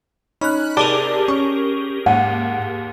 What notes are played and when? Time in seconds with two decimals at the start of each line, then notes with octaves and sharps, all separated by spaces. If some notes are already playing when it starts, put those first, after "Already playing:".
0.41 C#4 D#4 B5 F#6
0.77 C3 G4 G#4 A#4 D5 A5
1.28 C#4 C#6
2.06 D#2 G#2 F#5